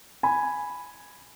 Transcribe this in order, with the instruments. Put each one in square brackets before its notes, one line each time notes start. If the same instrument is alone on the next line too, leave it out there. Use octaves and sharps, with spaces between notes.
[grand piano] G#5 B5